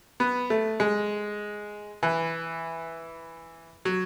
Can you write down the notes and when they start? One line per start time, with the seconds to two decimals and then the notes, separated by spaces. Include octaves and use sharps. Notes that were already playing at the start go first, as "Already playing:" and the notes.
0.20 B3
0.50 A3
0.80 G#3
2.03 E3
3.85 F#3